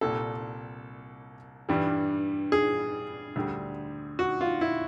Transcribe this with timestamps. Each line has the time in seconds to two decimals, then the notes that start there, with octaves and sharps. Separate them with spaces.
0.01 C2 A#2 G3 A4
1.69 G2 E3 G3
2.52 G#4
3.36 D2 D3 G3
4.19 F#4
4.41 F4
4.61 E4